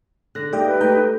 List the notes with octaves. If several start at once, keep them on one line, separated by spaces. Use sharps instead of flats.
D3 F#6 A#6
A#3 D#4 G4 D5 E5 G5
B4
A3 G5 A#5 G6